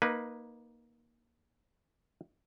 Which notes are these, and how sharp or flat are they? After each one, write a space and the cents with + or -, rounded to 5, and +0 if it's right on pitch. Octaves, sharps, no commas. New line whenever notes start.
A#3 +15 D#4 +0 B4 +0